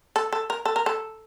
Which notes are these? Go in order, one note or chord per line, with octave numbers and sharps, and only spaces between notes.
A4
A4
A#4
A4
A#4
A4